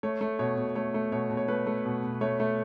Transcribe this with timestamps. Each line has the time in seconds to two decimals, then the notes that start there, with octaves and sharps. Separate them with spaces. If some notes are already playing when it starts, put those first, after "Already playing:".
0.03 A3 C#5
0.21 A3
0.39 B2 C#5
0.57 B2
0.75 A3 C#5
0.94 A3
1.12 B2 C#5
1.30 B2
1.37 C#5
1.48 A3 B4
1.67 A3
1.85 B2
2.04 B2
2.21 A3 C#5
2.40 A3